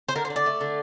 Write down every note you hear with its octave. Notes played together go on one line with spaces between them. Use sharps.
C5
D3 A#4
C5
D4
D5
A3
D3